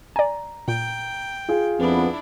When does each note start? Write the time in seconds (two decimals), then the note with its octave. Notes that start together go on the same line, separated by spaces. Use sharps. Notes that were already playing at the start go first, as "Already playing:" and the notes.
0.16 D5 G#5 A#5
0.68 A#2 G5
1.48 F4 G#4
1.79 F2 B3 D4 E4